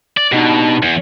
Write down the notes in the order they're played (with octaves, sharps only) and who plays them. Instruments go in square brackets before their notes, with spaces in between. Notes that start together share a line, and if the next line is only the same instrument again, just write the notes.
[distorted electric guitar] D5
[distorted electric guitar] B2 [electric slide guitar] D4 D#4 G4
[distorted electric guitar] E2